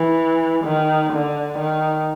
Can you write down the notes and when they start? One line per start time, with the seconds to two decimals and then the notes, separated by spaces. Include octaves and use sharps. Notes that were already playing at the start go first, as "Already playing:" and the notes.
Already playing: E3
0.64 D#3
1.12 D3
1.58 D#3